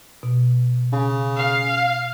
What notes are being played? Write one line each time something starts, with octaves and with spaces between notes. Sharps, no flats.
B2
C#3
F5